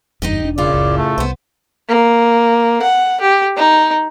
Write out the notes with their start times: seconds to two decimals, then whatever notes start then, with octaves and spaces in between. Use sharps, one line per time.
0.22 F#1 E2 G2 D#4 G4 D#5
0.42 E1 D4
0.58 F#2 A2 C#3 E4 F4 D5
0.73 F#1 C#2
0.98 A3
1.18 C2 B3 C5
1.89 A#3
2.82 F#5
3.21 G4
3.57 D#4